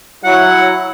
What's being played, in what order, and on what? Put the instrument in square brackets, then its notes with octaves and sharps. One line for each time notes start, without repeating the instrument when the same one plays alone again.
[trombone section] F#3 E4 [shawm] F#5